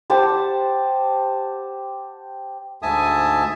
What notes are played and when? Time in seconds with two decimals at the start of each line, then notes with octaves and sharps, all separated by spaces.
0.10 G4 C5 F#5 A5
2.82 D2 G#2 E5 G#5 A5 D#6